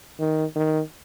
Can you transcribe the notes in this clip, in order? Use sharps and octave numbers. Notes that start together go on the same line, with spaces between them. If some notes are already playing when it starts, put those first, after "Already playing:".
D#3
D#3